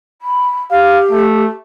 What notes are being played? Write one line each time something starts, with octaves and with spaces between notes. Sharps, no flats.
B5
G4 F5
A3